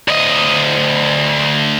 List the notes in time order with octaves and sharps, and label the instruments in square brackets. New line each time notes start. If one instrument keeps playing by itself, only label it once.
[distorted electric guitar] D2 D#5